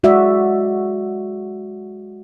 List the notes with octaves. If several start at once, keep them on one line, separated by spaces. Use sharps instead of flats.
G#3 F#4 D5 E5